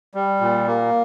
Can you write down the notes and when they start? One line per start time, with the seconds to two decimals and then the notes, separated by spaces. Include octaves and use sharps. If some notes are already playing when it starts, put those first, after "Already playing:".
0.14 G3
0.41 A#2
0.67 A#3